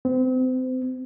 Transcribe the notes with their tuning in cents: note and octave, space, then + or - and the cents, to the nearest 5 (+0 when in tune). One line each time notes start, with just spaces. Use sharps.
C4 -35